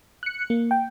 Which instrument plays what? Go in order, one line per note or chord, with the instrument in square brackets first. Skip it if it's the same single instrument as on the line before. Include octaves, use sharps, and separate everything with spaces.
[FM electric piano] F#6 C#7
A#3
G5